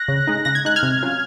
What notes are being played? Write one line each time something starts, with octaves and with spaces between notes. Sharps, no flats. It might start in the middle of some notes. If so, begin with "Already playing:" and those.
Already playing: F#6 A#6
C#3
G#3 D#4
C#3 A#6
G#6
G#3 D#4 F#6
F6 G#6
C3
F#3 C#4 F4